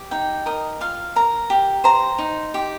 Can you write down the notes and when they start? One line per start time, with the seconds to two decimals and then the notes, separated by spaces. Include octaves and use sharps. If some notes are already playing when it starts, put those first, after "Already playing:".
Already playing: G4
0.11 D#4 G5
0.46 A#4 D#5
0.81 F4 F5
1.16 A#4 A#5
1.50 G4
1.84 C5 A#5
2.18 D#4
2.54 G4